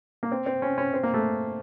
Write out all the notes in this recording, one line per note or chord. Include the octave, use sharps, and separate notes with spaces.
A#3
C4
C4
C#4
C#4
C4
A#3
A3